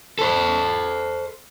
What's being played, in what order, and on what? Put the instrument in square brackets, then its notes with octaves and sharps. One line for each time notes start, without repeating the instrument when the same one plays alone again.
[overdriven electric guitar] A4 C5